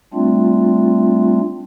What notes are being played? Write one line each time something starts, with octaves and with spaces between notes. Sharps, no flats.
G3 A3 C4 D4 F4